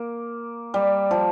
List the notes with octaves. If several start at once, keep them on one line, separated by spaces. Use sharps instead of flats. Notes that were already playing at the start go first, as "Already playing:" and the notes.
Already playing: A#3
G3
F3